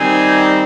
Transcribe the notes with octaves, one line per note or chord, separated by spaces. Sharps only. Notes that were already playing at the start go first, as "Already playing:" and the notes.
Already playing: D#3 G3 C4 D#4 G#5